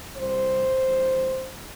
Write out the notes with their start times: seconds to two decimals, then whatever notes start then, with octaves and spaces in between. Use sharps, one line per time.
0.16 C2 C3 G3 C5
0.85 E2 D3 G3